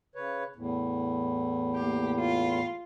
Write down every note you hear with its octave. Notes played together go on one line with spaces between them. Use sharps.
C#3 B4 C#5
E2 A2
A#3 G4
F4